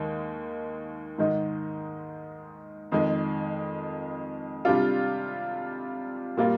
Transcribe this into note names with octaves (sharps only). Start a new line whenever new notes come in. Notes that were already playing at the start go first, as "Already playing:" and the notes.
Already playing: D#2 D#3 G#3
G#2 D#3 G#3 D#4
F2 D#3 G#3
C3 G3 D4 F4
A#2 G3 A#3 F4